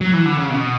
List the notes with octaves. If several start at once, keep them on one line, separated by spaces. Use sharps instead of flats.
F#3
E3
D3
C#3
B2